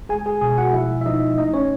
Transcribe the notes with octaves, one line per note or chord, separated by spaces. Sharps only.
G#3 G#4 G#5
G#4 G#5
B2 G#4 G#5
F#4 F#5
F3 E4 E5
E5
F3 D#4 D#5
A3 D#4 D#5
C#4 C#5